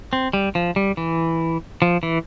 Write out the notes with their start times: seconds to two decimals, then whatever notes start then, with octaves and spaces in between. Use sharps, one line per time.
0.13 C4
0.33 G3
0.55 F3
0.76 G3
0.97 E3
1.82 F3
2.03 E3